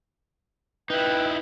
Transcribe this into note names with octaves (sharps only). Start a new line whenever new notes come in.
D#4 E4 B4 G5